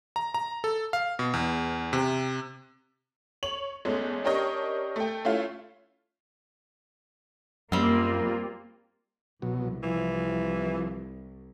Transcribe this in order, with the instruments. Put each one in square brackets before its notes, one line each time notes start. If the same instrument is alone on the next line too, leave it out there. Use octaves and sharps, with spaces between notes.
[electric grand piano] A#5
A#5
A4
F5
B2
E2
C3
[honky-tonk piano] C#5 F7 F#7
E2 G#3 A3 C#4
C#4 D4 G4 A#4 C#5 D#5
A3 G5
A3 C#4 E4 F4
[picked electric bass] F#2 [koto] G3 C4 [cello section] A#3 F4
[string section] C2 [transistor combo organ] B2 F#3
[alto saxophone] E3 [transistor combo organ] F3